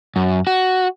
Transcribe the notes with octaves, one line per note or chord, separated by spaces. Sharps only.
F#2
F#4